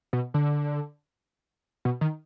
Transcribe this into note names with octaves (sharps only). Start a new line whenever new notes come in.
B2
D3
B2
D#3